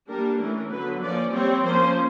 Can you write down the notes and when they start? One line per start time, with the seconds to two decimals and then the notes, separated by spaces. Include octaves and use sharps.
0.08 G3 A#3 D4 A#4
0.39 E3 A3 C#4 A#4
0.70 D3 F#3 B3 B4
1.01 F3 A#3 C#4 D5
1.32 G3 C4 C#5
1.63 F3 A#3 C#4 C5